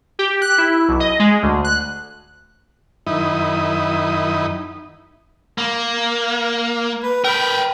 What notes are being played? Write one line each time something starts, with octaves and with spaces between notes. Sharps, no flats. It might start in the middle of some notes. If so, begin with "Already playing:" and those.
G4
F#6
E4
B1
D#5
G#3
D2
F#6
F#2 D#3 D#4 E4 B5 D#6
A#3
B4
A#4 B4 G5